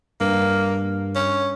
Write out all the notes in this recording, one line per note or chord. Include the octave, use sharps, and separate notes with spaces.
G2 A#3
C#4